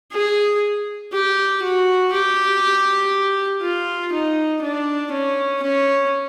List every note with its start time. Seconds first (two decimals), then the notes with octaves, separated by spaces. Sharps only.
0.12 G#4
1.13 G4
1.62 F#4
2.12 G4
3.62 F4
4.13 D#4
4.62 D4
5.12 C#4
5.62 C#4